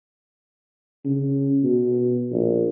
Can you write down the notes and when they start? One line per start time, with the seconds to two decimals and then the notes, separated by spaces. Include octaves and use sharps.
1.05 C#3
1.64 B2
2.32 A#1